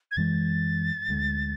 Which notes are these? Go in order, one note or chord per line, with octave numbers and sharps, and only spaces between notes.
G#6
F#2 E3 G#3 A6
D2 D3 G#3